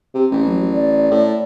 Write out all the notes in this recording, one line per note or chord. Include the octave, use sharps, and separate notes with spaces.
C3
A1 C#4
F#3
D5
A2